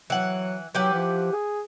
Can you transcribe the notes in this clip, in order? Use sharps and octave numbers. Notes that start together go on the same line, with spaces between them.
E3 F#3 F#5
E3 F#3 G4 F#5
F3
G#4